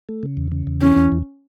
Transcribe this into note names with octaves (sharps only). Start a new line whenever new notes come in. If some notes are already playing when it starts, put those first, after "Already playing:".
A3
C#3
E2
C#3
E2
E3 C#4
E2
E2